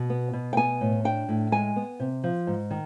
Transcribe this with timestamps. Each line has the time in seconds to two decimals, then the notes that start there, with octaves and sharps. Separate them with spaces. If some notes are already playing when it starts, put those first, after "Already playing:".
Already playing: B2
0.10 B3
0.33 B2
0.53 G5
0.57 B3 G#5
0.81 A2
1.04 D4 G5
1.29 A2
1.52 G#3 G#5
1.76 B3
2.00 C3
2.24 F3
2.47 G#2
2.70 D#3